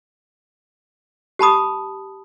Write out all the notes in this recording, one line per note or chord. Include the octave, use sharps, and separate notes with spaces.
G4 A5 B5 D#6